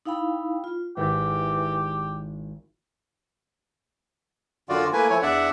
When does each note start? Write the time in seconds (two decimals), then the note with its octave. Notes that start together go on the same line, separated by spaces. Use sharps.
0.06 D#4 E4 F5 G5 B5
0.64 F4
0.97 G#1 E3 E4 G4 G6
4.69 F#2 D3 F4 F#4 D5
4.93 A3 A#3 E4 B4 G#5
5.10 F3 A3 E4 C#5 G#5
5.22 E2 D4 D5 E5 F#5